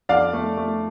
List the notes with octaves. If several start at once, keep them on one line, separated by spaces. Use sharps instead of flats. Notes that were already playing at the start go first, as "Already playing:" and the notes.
F2 D5 F5
A3
A3